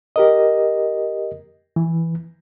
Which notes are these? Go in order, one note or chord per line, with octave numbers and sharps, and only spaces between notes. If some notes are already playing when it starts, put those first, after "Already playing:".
G4 A#4 D#5
E3